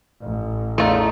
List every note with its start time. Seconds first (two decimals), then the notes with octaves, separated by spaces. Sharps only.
0.21 A1
0.78 E2 A3 C#4 D#4 F4